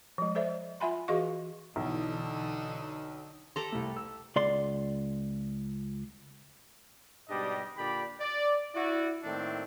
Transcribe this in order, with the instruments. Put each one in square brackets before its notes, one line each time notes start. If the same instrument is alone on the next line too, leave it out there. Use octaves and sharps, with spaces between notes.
[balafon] F3 G#3
A4 C5 D5 E5
F4 E5 F#5 G#5 B5 C6
E3 F#4 G#4 D#5 F5 C#6
[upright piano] B1 [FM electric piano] B2 E3 [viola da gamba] D3 D#4
[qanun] G4 A4 A#5 [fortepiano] C6
[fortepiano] C2 A3
E6
[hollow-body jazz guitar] C#2 D5 C6
[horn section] G#2 B2 G3 D4 G4 D#5
A#2 D3 D4 G4 D5 B5
D5
E4 F#4 D5
A2 D#3 A3 A#3 C4 D4